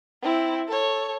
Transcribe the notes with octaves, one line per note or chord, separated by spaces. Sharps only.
C4 E4
A4 C#5